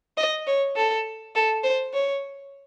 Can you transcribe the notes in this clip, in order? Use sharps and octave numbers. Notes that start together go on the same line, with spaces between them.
D#5
C#5
A4
A4
C5
C#5